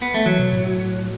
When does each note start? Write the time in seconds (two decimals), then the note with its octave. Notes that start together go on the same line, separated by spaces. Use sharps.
0.02 B3
0.14 A3
0.26 E3 F#3
0.39 B2
0.53 A2